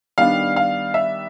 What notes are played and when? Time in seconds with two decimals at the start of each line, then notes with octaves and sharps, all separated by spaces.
0.18 D#3 G3 B3 D4 F5
0.56 F5
0.94 E5